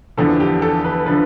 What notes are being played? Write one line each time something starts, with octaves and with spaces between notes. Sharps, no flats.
E2 D3 F3 A4
G4
A4
B4
D3 F3 B4